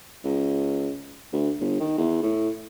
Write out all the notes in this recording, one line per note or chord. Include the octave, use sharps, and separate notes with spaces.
C#2
D2
G1
D#3
E2
A2